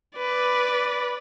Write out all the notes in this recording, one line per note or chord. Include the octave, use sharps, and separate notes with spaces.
B4 D5